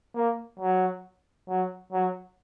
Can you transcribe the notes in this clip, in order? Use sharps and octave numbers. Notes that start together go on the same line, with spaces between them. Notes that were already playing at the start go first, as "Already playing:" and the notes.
A#3
F#3
F#3
F#3